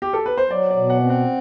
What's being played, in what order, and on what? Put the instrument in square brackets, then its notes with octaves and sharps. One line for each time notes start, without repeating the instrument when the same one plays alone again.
[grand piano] G4
A4
B4
C5
[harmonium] F#3 [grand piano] D5
[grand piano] D5
[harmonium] B2
[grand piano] F#5
[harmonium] C4
[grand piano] F#5